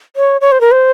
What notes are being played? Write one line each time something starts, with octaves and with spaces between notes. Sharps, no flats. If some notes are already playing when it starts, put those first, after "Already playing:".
C#5
C#5
C5
A#4
C5